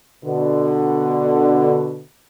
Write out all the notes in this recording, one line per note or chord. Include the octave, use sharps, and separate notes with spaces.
B2 D3